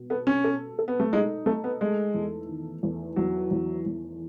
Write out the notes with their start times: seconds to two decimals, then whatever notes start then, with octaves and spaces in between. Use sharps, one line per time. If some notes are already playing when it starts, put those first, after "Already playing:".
Already playing: B2
0.10 B3 A4
0.27 C#4
0.44 A4
0.79 A4
0.88 B3
1.00 A3
1.13 G#3 D#4
1.46 A3 A4
1.64 B3
1.81 G#3 A3
2.14 E2
2.49 D#3
2.83 E2
3.16 E2 F#3
3.51 E2
3.86 E2